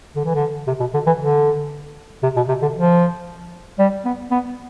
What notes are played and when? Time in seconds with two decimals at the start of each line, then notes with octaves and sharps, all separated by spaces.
0.16 D3
0.25 E3
0.35 D3
0.67 C3
0.80 B2
0.94 D3
1.07 E3
1.20 D3
2.23 C3
2.36 B2
2.49 C3
2.62 D3
2.75 F3
3.79 G3
4.05 B3
4.31 B3